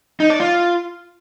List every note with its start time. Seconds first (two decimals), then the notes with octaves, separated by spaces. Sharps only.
0.20 D#4
0.30 D5
0.40 F4